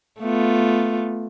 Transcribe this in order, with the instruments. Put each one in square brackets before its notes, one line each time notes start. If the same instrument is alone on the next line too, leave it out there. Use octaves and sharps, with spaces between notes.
[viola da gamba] A3 B3 F4